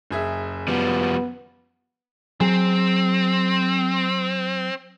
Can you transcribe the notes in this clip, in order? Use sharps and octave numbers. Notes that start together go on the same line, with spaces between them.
F#1 G#4 E5
F3 G3 B3
F#3 C4 G#4